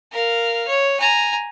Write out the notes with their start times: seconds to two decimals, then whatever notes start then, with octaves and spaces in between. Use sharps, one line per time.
0.12 A#4 F5
0.68 C#5
1.00 G#5 A#5